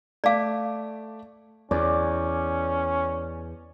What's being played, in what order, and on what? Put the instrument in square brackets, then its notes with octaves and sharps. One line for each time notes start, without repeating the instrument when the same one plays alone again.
[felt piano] A3 D6 [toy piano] D5 F5
[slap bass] E2 [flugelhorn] C#4 [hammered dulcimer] D5